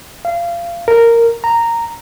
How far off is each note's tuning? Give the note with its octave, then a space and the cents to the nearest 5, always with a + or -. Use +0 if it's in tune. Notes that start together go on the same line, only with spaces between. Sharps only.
F5 -25
A#4 -10
A#5 -10